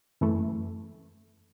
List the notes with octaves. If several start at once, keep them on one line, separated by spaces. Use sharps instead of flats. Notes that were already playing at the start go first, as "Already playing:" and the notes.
F#2 E3 A3